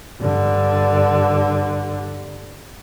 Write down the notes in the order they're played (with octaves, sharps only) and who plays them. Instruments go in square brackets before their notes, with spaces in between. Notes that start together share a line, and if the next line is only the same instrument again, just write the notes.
[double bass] G2 D3